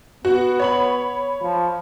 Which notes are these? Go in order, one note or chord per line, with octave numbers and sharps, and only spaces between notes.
B3 F#4
C#5 B5 F#7
F3